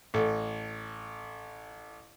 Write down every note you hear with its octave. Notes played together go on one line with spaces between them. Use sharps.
A1 A4